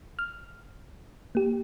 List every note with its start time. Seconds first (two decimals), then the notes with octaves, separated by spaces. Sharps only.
0.19 F6
1.35 A#3 G4